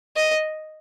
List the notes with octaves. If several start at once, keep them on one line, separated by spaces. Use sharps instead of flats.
D#5